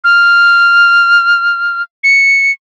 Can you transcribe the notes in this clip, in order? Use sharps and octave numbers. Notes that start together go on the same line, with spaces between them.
F6
C#7